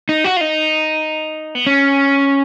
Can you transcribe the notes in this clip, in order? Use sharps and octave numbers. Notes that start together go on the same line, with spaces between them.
D#4
F#4
F4
D#4
B3
C#4